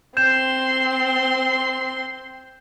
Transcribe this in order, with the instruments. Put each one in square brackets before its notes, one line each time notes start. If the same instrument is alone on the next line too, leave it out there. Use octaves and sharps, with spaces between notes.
[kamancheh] C4 C6 [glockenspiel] G6 E7